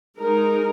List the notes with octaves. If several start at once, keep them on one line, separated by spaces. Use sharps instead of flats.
G#3 D#4 A#4